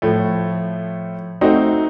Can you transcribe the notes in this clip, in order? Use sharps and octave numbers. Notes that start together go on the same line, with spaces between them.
A2 F3 A3
A3 C4 D#4 F#4